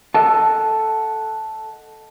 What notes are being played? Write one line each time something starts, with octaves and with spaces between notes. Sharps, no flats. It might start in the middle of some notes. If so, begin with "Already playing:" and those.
A4 D#5 F#5 A5